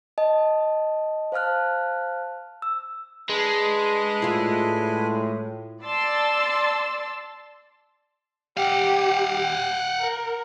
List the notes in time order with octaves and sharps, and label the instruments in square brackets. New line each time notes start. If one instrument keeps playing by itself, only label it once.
[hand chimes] D#5 A5
C5 F5 A5 F6 F#6
E6
[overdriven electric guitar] G#3 [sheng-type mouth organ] D4 B4 G#5
[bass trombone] A2 [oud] E4 F4
[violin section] D5 A5 C6 E6 A6
[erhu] G4 [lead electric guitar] F5 F#5
[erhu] F#6
A#4